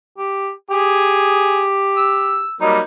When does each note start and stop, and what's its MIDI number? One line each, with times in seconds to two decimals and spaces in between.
0.18 0.50 67
0.70 2.44 67
0.70 1.63 68
1.97 2.54 88
2.61 2.80 54
2.61 2.79 55
2.61 2.80 58
2.61 2.80 63